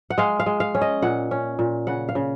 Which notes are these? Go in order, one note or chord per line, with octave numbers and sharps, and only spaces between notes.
F#5
G#3 F5
F5
G#3
F5
C#4
D#5
A#2 F#5
C#4
A#2
C#3 F#5
F5
C#3